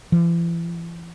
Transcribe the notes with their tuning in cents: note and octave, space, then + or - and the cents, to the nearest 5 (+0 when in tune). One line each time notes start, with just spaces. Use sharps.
E3 +45